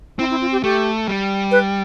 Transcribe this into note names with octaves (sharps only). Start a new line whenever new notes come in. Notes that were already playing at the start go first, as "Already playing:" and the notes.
C4 E4
E4
F4
G4
A3 G4
G3
B4